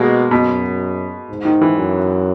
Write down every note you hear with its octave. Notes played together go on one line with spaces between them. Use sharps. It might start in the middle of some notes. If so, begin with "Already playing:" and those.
Already playing: B2 G#3 A#3
F#2 B2
G#2
D#3
E3
F#2